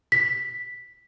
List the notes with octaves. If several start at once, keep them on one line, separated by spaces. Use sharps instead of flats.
B6